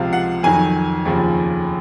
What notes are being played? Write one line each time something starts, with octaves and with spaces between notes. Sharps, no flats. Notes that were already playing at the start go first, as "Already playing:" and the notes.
Already playing: C#2 C3 F3 F5
F#5
F2 D#3 F#3 G#5
F1 D#2 C#3 F3